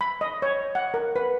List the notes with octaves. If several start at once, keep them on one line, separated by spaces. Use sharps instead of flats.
B5
D#5
C#5
F#5
A#4
B4